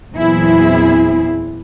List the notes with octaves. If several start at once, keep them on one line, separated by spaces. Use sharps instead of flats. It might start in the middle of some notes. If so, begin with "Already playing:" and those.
E2 A#2 F#3 C4 E4 G#4